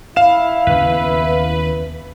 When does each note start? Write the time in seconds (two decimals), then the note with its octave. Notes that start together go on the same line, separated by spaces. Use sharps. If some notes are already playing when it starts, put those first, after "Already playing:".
0.16 E4 F5 E7
0.67 D#2 C#3 B3 B4